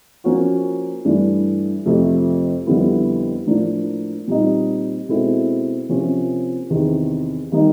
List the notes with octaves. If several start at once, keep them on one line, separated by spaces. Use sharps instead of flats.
F3 A#3 C#4 F#4
G2 E3 A3 D4
F2 C3 F3 A3
F2 D3 G3 B3 E4
A2 F3 A#3 D4
A#2 G3 C4 D#4
B2 G#3 C4 E4 A4
C3 F3 A#3 C#4 F4
E2 C3 D#3
D#3 G3 A#3 D#4